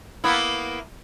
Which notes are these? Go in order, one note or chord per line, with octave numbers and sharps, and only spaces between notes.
A#3 B3 E4